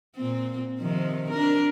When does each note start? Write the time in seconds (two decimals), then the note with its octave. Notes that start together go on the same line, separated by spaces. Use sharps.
0.16 A#2 C4
0.80 C3 D#3 F3
1.31 D4 A#4